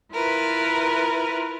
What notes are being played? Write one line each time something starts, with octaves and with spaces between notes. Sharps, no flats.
E4 F4 A#4 B4